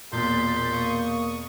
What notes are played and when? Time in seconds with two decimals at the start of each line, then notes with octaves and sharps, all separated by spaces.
0.12 E1 A#2 C6 G6 A6 B6
0.72 A#3 C#6 D#6